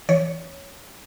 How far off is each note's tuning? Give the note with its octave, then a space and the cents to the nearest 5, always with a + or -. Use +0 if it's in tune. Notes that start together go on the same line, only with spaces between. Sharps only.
E3 +0 C#5 +0